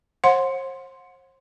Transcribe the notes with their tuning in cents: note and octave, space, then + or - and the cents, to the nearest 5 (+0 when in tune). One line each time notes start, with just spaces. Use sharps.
C5 +40 F#5 -25 C6 +0